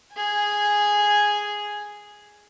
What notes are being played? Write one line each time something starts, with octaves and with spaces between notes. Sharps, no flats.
G#4 G#5